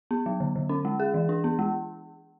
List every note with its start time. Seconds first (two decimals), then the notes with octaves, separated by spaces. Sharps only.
0.11 B3
0.26 F#3
0.40 D3
0.56 D3
0.69 C#4
0.85 G#3
1.00 G#4
1.14 E3
1.29 D4
1.44 B3
1.59 G#3